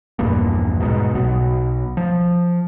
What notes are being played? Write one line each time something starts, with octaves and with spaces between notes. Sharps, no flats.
A#1 E2 G2 A#2
G#2 B2
B1 B2
F3